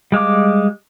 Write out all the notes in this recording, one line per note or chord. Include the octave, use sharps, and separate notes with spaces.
G3 G#3 F5 D6